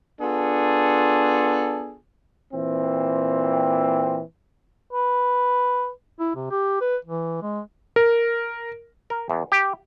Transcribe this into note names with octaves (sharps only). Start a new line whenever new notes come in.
B3 D4 F4 G#4 A4
A#2 E3 C4
B4
E4
C3
G4
B4
E3
G#3
A#4
A#4
E2
G4